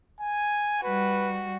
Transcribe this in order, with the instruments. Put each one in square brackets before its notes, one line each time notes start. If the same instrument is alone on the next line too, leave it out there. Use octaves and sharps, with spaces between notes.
[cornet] G#5
[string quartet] G3 F#4 [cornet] B4